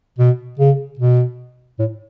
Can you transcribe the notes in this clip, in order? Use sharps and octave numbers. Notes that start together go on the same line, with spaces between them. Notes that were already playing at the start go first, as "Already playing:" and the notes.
B2
C#3
B2
A2